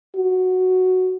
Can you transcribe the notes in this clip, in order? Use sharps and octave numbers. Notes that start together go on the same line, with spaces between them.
F#4